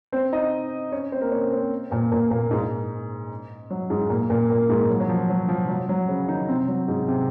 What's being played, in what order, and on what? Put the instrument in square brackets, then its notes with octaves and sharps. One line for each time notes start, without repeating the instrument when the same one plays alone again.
[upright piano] C4 C5
D#4 D#5
C#4 C#5
C4 C5
A#3 A#4
C#4 C#5
C4 C5
A#2 A#3
A#2 A#3
A#2 A#3
G#2 G#3
F#3
G#2 G#3
A#2 A#3
A#2 A#3
A#2 A#3
G#2 G#3
F#3
F#3
F3
F#3
F3
F#3
F#3
C#3 C#4
D#3 D#4
C3 C4
F#3
G#2 G#3
C3 C4